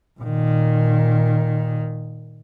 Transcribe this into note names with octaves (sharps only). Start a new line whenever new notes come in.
A#2 D#3